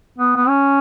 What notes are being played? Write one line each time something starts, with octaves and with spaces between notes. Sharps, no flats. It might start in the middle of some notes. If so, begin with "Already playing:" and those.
B3
B3
C#4